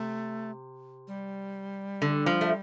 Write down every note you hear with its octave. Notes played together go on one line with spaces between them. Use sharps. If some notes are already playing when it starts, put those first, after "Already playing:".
Already playing: C3 A3
G3
D3
F3
A3